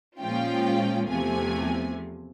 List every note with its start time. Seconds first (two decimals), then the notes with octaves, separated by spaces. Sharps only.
0.20 A#2 F3 G#3 C#4 F4 G5
1.09 E2 C3 F3 A3 G#5